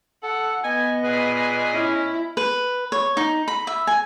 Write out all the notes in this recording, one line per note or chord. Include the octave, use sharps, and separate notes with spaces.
A4 F#5
B3 D#5 G#5
A#2 G#4 B4 G#5
C#4 E4
B4
C#5
D#4
B5
E5
G#5